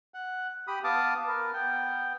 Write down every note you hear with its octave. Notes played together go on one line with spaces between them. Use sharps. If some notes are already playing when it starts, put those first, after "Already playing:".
F#5
G4 B5 D#6
B3 F5 A5 D6 D#6
A#4 B4
B3 G5